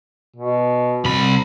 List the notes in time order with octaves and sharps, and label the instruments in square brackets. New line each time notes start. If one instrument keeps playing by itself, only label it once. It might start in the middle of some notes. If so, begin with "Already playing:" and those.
[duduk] B2
[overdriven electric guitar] C2 B5